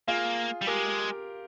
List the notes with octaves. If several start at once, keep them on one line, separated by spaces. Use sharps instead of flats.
A#3 F4 G#4
G3
G#3 G4 A#4